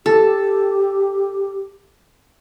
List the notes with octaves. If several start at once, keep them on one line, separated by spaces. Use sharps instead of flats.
G4 A4